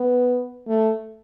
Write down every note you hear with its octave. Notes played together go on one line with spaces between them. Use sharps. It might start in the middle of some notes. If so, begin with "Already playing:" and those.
Already playing: B3
A3